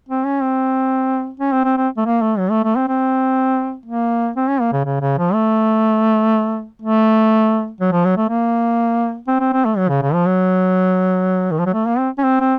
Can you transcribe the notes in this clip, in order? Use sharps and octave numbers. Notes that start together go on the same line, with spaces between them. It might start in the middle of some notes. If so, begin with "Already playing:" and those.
C4
C#4
C4
C#4
C4
C4
C4
A3
A#3
A3
F#3
A3
A3
C4
C4
A#3
C4
C#4
A#3
C#3
C#3
C#3
F3
A3
A3
F#3
F3
F#3
A3
A#3
C4
C4
C4
A3
F#3
C#3
C#3
F3
F#3
D#3
F3
F#3
A3
A#3
C4
C#4
C4
C4